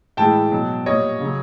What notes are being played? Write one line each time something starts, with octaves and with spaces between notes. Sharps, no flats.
A2 E3 G#3 G5 A5
B2 F#3
A#2 G3 C#5 D#5
C#3 F#3